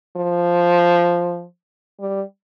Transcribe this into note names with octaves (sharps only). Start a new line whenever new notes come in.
F3
G3